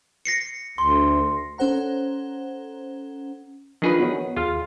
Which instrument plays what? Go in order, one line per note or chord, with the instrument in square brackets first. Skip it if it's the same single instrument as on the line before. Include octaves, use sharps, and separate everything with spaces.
[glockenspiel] A#6 C7 C#7
[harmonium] D2 [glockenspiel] C6
[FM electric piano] C#4 A4 C5 F#5 A#5
[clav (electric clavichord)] D#3 G#4 B4 [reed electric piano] F3 D4 F4
[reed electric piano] B3 F#4 C#5
[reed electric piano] D#2 G#4 F6 [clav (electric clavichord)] F4